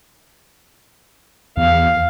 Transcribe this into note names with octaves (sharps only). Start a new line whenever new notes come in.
E2 F5